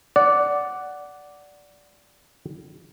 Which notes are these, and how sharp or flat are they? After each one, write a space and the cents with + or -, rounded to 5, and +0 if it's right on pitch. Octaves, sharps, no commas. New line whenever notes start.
D5 -10 F#5 +5